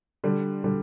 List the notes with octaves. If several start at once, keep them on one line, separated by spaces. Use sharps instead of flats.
D3 G3
D3 G3